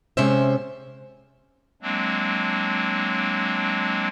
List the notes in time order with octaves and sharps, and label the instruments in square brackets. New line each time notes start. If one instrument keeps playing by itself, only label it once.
[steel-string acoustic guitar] C3 G#3 C#4 C5 E5
[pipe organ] F#3 G#3 A#3 C4 D4